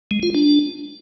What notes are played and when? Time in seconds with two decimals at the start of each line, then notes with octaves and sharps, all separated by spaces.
0.11 G#3
0.23 F4
0.35 D4